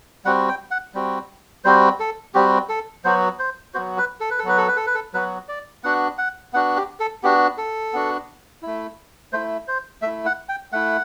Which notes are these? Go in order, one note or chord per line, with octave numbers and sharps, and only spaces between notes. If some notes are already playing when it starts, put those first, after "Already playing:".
G3 C4 F#4 F#5
G5
F#5
G3 C4 F#4
G3 C4 F#4 C5
A4
G3 C4 F#4 G4
A4
F#3 B3 F#4 C5
C5
F#3 B3 F#4 C5
B4
A4
B4
A4
F#3 B3 F#4 B4
A4
B4
A4
B4
A4
F#3 B3 F#4 B4
D5
B3 D4 F#4 F#5
F#5
B3 D4 F#4 F#5
G4
A4
B3 D4 F#4 G4
A4
B3 D4 F#4
A3 E4
A3 E4 C5
C5
A3 E4 E5
F#5
G5
A3 E4 F#5